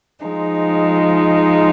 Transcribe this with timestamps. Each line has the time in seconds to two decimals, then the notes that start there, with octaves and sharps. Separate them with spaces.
0.24 F3 G#3 D#4